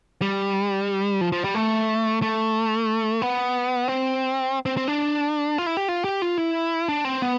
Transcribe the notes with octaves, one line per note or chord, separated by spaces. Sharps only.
G3
F3
F3
G3
A3
A3
B3
C4
C4
C4
D4
F4
E4
G4
F4
G4
F4
E4
D4
C4
B3